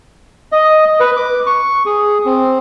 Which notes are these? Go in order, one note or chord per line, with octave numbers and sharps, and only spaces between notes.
D#5
B4
D6
C#6
G#4
C4